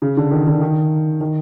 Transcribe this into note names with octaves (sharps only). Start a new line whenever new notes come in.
C#3
D3
D#3
D3
D#3
D#3